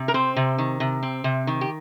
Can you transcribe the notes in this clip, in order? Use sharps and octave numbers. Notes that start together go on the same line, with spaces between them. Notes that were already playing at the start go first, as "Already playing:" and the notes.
Already playing: C3
A#4
C4 C5
C3
D#3
C3
C4
C3
D#3
G4